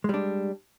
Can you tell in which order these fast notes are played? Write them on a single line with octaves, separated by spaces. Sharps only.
G#3 G3 D4